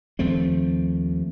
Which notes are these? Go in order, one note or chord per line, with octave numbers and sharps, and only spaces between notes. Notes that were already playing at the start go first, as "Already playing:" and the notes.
D#2 F3 A3 C4